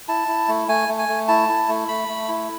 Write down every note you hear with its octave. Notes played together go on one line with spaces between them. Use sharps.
E4 A5
E4
A3
A3 G#5
A3
G#5
A3
E4 A5
E4
A3
A3 B5
A3
E4